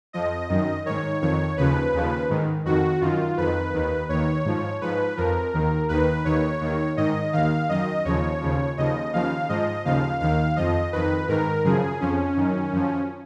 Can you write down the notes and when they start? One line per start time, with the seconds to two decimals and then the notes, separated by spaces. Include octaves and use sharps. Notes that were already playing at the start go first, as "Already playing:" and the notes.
0.13 F2 F3 D#5
0.49 F#2 D#3
0.86 G#2 D#3 C#5
1.21 F2 D#3 C#5
1.57 D#2 C#3 F3 B4
1.94 D#2 C#3 F3
2.30 G#2 D#3
2.65 F2 D#3 F#4
3.01 F#2 D#3 F4
3.37 F2 D#3 B4
3.74 D#2 D#3
4.09 D#2 D#3 C#5
4.45 G#2 F3
4.81 G#2 F3 B4
5.17 F2 F3 A#4
5.54 D#2 D#3
5.89 D#2 D#3 B4
6.25 D#2 D#3 C#5
6.61 D#2 D#3
6.97 G#2 D#3 D#5
7.33 D#2 D#3 F5
7.69 F#2 D#3 D#5
8.05 D#2 C#3 F3 C#5
8.41 D#2 C#3 F3
8.78 D#2 C#3 F3 D#5
9.13 D#2 C#3 F3 F5
9.49 G#2 F3 D#5
9.85 D#2 C#3 F3 F5
10.20 D#2 D#3 F5
10.56 F2 F3 D#5
10.93 F2 D#3 B4
11.29 G#2 D#3 A#4
11.64 F#2 C#3 F3 G#4
12.01 F2 F3 C#4
12.37 F#2 D#3
12.72 F#2 F3